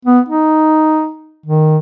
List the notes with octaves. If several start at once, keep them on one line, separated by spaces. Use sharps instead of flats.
B3
D#4
D#3